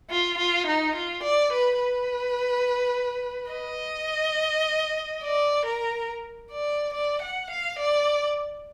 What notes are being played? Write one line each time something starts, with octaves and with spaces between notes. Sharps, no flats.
F4
F4
D#4
F4
D5
B4
B4
D#5
D5
A#4
D5
D5
F#5
F5
D5